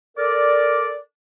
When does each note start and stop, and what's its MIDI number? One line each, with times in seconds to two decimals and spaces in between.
0.18 0.96 69
0.18 0.96 70
0.18 0.96 74